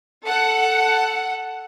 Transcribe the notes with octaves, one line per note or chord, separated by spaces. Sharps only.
A4 F#5